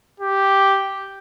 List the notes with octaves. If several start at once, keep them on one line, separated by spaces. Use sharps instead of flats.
G4